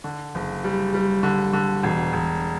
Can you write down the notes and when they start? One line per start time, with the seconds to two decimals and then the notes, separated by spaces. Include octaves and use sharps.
0.04 D3
0.35 F#1
0.64 G3
0.94 G3
1.23 D3
1.53 D3
1.83 E1
2.13 E1